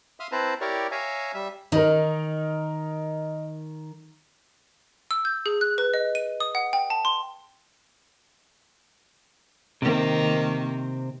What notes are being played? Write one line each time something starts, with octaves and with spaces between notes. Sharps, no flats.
E5 F5 C6 D#6 F6
C4 E4 B4 C5 A5 A#5
E4 G4 A#4 C#5 D5
C#5 E5 F5 G#5 A#5
G3 E5
D#3 D#4 A#4
E6
G6
G#4
F#6
B4
D#5
D#7
D#6
F#5
G5
A5
C6
C3 D#3 A#3 C4